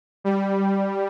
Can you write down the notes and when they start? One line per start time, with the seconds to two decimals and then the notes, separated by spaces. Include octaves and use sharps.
0.24 G3